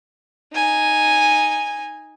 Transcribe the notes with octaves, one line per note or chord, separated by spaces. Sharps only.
D#4 G#5